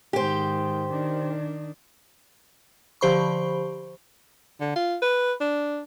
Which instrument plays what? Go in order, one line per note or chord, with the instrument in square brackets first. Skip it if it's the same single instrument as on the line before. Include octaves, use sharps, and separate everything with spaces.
[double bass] G#2 D#3 [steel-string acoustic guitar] G4 C5
[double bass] D#3 D4
[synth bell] D3 F3 G4 C5 B5 C#6
[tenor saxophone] D3
F4
B4
D4